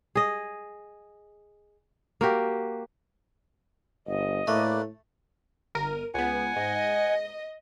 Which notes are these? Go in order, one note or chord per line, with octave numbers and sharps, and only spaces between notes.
G#4 D#5
A#3 F#4 G4
G1 D#5
A2 A3 A#3 B4 D5
G1 A#4 D#7
C#2 B3 F#5 G#5
G#2 D#5